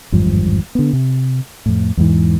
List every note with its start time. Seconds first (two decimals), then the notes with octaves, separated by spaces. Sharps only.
0.12 G#1 E2 G2 F3
0.75 D3 B3
0.93 C3
1.66 F2 A2
1.97 E2 G#2 E3